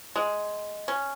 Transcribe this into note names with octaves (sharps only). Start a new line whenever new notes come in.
G#3
C#4